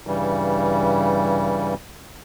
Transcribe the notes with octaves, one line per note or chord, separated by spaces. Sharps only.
G2 C#3 E3 G3